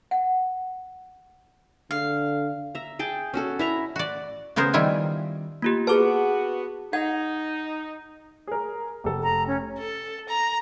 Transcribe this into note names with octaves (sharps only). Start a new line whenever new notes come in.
F#5
D3 F5
E5 A#5
G#4 G5 A5
C#4 F#4 A4
E4 E5 A#5
F#4 D5
C#3 B3 G#4 A#4 C5
D#3 G3 E4 F4 G#5
A#3 F4 G4
B3 F#4 G#4 B4 A5 D6
D#4 F#5 G#6
G#4 A#4
F1 A4
A#5
C#4
A4
A#5